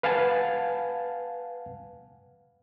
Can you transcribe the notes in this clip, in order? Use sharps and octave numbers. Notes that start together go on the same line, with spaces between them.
B4 F5 F#5 G#5 A5